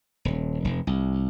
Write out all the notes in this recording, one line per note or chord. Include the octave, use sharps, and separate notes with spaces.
D#1
F1
C2